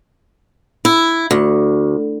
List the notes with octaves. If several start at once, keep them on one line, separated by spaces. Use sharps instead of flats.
E4
D2